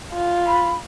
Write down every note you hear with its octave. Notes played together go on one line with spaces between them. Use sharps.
F4
B5